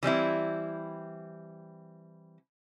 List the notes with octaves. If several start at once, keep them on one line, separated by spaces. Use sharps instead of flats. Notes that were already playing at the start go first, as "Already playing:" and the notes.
E3 G3 C4 E4